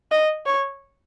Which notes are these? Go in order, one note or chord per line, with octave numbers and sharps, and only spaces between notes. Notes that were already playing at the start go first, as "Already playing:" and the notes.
D#5
C#5